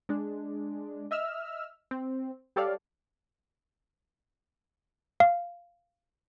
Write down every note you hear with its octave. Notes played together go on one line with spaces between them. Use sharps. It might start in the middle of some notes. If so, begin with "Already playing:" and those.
G#3 D4
D#5 E5 E6 F6
C4
G3 G4 A4 C#5 D5 F5
F5